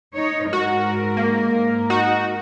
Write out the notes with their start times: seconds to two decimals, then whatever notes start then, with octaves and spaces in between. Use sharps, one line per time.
0.14 D#4 C#5
0.53 G#2 F#4 A#4
1.17 A#3
1.90 D#4 F#4